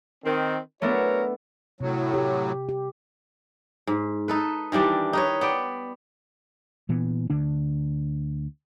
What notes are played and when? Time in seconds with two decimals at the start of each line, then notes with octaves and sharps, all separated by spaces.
0.25 D#3 C4
0.82 A3 B3 D4 F#4 A#4 C#5
1.81 A2 C3 F#3
2.14 G4
2.69 G4
3.87 G#2
4.28 D#4 A4 B4
4.72 D#3 E3 G3 D4
5.13 D#4 B4 C#5
5.41 B3 D5 G5
6.89 A#2 E3 B3
7.30 D2 D3 D4